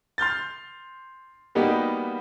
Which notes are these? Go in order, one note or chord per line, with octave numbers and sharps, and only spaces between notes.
C6 F6 G6 A6
G3 A#3 B3 D#4 F#4 G4